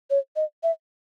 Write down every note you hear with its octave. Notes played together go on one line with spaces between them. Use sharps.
C#5
D#5
E5